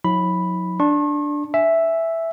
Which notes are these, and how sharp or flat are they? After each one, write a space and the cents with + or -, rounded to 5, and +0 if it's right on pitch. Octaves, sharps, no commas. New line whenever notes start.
F#3 -40 D#4 +45 B5 +0
D4 +0 C#6 -45
E5 +0 G#5 +0